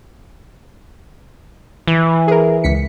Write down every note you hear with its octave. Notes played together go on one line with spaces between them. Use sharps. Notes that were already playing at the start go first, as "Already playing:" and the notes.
E3
G#4 A#4
C#2 B6 C#7